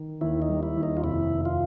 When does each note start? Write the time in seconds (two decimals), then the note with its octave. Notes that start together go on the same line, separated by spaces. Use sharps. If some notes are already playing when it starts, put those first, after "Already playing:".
Already playing: D#3
0.21 D#2 E4
0.42 D#4
0.49 G3
0.63 E4
0.77 D#2
0.83 D#4
0.97 F4
1.04 F1 E4
1.31 D#2
1.45 F4